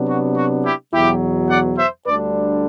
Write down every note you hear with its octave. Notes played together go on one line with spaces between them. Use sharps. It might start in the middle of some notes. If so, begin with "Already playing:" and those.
Already playing: C3 F#3 B3 D4
F#4
F#4
E4 G4
E2 B2 F#3 E4 G4
D5 F#5
C5 E5
D2 D3 G3 D4 B4 D5